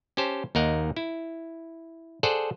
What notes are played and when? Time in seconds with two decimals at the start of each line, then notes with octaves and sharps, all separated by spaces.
0.17 C#4 G4 C5 A5
0.55 D#2 D#4 A#4 F#5
0.97 E4
2.23 G#4 A4 C5 D5 F#5